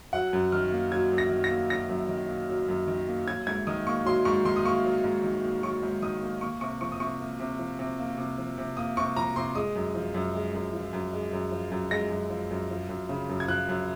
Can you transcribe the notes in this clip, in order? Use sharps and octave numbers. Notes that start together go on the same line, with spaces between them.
F#3 F#5
F#2
D#3 F6
A#3
F#3 G#6
F#2
A#6
D#3
A#6
A#3
F#3 A#6
F#2
D#3
A#3
F#3
F#2
D#3
A#3
F#3 G#6
G#2 G#6
D#3 D#6
A#3 C#6
F#3 C6
G#2 C#6
D#3 C6
D#6
A#3 C#6
F#3
G#2
D#3
A#3
F#3 C#6
G#2
D#3 D#6
A#3
A#3 C#6
C3 C#6
F3 C#6
D#6
C3 C#6
A#3
C3
F3
C3
A#3
C3
F3
C3
A#3 D#6
C3 C#6
F3 A#5
C3 C6
G#3 D#6
F#2
F3
F#2
G#3
F#2
F3
F#2
G#3
F#2
F3
F#2
G#3 A#6
F#2
F3
F#2
F3
F#2
C#3
F#2
G#6
F3 F#6
F#2